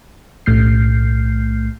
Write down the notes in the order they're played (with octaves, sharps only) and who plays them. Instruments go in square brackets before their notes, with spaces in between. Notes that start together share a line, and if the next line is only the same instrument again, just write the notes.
[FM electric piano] B1 A2 A3 F6 G6 C7